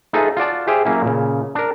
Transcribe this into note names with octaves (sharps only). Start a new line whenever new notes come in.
D#4 F4 G#4 A4 B4 E5
F4 F#4 D5 A5
G4 G#4 C5 E5 F5 G#5
F#3 A#3 C#4 E4
A#2 C#3
D4 A#4